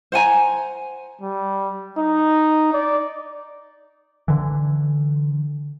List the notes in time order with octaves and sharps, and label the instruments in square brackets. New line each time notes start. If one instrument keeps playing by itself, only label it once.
[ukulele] C5 F#5 G#5 A#5
[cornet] G3
D#4
D5
[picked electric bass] D3 E3